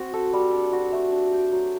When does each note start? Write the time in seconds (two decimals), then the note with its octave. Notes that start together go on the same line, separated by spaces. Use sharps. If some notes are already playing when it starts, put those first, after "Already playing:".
Already playing: C4 F#4
0.14 A4
0.33 G3
0.53 D4
0.73 F#4
0.92 A3
1.12 D4
1.32 G4
1.52 F#3